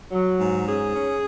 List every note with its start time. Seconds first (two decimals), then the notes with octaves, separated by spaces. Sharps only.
0.11 F#3
0.39 G#2
0.66 C#4 G#4
0.94 C#4